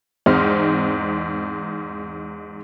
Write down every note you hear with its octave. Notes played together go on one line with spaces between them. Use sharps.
E2 G#2 C4 D#4 C5 F6